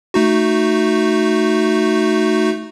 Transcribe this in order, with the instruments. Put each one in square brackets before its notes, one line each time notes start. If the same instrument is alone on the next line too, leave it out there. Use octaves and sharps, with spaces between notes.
[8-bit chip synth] A3 D#4 F#4